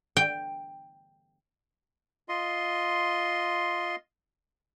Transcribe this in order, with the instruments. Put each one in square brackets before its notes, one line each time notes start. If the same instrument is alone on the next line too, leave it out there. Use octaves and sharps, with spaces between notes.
[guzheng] G5
[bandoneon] F4 D#5 C6